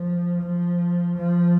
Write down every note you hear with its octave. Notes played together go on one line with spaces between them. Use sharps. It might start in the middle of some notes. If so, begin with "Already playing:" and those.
Already playing: F3
F3
F3